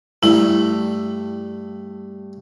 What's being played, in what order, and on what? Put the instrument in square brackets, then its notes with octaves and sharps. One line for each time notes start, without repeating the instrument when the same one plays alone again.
[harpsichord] G2 A3 [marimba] E4